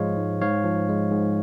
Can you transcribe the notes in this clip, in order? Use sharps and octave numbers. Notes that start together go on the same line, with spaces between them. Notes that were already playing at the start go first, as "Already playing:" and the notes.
Already playing: G#2 F3 G#3 C#5 F5
G#2
G#2 C#5 F5
F3
G#3
G#2